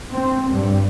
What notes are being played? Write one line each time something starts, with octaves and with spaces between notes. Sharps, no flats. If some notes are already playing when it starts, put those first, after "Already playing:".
C4
G2